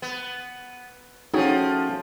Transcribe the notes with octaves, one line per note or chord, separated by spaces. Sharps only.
B3
F3 A3 C#4 D#4 F#4 G#4 G5